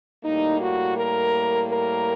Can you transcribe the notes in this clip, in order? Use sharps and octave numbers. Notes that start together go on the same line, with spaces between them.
A2 G3 A#3 D#4
F#4
A#4
A#4